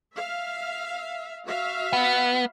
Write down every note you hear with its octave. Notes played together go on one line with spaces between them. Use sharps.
E5 F5
F#4 E5 F5
B3